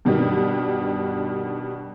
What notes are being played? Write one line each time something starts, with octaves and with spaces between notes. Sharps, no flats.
G2 B2 D#3 G3